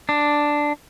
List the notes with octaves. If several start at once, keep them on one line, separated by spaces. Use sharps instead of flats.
D4